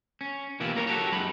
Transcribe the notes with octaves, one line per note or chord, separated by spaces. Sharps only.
C#4
B2 E3 A#3 E4 F4 G4
A#3 A#4 C#5
F#4 G4 A4 C#5
F#2 G#3 D#4 B5